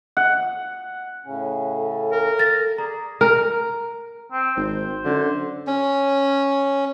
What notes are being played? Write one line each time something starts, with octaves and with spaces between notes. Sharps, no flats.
F#5
A2 C#3 C#4
A4
A#4
A6 A#6
G#4 D5 A#5
A#4
C4
G#1 C5
F#2 D3
C#4